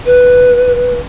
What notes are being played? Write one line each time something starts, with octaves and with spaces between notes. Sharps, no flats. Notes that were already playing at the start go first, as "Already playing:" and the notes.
B4